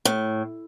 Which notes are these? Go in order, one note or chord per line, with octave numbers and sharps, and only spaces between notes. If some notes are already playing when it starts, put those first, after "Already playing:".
A2